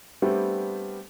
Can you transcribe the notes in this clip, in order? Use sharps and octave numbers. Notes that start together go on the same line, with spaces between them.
G3 A3 B3 C4 D4 G4